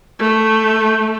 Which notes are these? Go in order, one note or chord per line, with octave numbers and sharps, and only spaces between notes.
A3